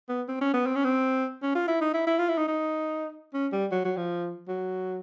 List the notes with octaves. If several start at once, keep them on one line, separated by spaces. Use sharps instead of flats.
B3
C4
C#4
B3
C4
C#4
C4
C#4
F4
E4
D#4
E4
E4
F4
E4
D#4
D#4
C#4
G3
F#3
F#3
F3
F#3